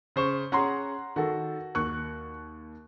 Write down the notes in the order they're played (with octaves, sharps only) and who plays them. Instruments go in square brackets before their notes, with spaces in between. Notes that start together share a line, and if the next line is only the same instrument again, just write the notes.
[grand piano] C#3 C5 C#6
[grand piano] C#4 G#4 [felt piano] F#5 A#5 C6
[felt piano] D#3 A4 [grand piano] F#4
[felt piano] D#2 C#6 F#6